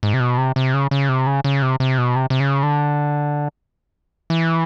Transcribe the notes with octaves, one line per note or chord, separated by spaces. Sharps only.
G#2
C3
B2
C3
C3
C#3
C#3
C3
C#3
C#3
C3
C3
B2
C3
C3
C#3
D3
E3